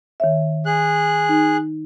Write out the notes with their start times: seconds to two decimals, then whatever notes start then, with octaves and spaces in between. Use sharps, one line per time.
0.20 D#3 C#5 E5
0.66 G#4 F#6
1.29 D#4